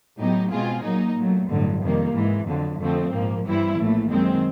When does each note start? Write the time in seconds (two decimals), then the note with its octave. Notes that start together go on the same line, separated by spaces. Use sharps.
0.17 A2 F#3 B3 D#4 G4
0.51 B2 G#3 C4 F4 G#4
0.83 A#2 F#3 A#3 D#4
1.16 A#2 F#3 A3
1.48 A1 G2 D3 F#3
1.82 F2 C3 D#3 G3 A#3
2.14 G#2 E3 G#3
2.47 F2 D3 F#3
2.79 F2 D3 F3 A3 C4
3.12 A#1 G#2 F3 A#3
3.46 G2 E3 G3 C4 E4
3.78 A#1 A2 E3 A3
4.10 F#2 D#3 G#3 C4